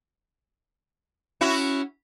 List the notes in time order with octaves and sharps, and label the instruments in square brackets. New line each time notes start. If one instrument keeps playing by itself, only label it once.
[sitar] C#4 E4 F#4